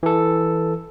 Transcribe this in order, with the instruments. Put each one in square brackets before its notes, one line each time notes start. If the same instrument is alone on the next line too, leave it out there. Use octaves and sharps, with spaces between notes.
[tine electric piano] E3 A4